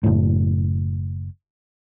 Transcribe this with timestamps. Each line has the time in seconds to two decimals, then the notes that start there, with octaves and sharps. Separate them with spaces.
0.04 F#1 A2